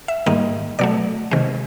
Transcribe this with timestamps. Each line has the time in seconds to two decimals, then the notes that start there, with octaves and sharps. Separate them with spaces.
0.08 E5
0.26 G#2 D#3 G3 A#3 D#5
0.79 B2 F#3 A3 D5
1.31 C3 D#3 G#3